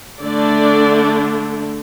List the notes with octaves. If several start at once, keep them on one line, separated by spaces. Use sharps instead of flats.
D3 A3 D4 D5